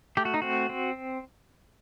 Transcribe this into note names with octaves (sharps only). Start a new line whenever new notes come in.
A3 G4
F#4
D#4
C4 F#4
C4